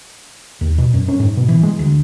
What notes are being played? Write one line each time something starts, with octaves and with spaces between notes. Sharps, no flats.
D#2
B2
F#2
C#4
G#2
B2
E3
G#3
D2